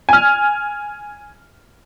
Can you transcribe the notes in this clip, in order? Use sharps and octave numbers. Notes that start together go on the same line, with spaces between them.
G#5 F6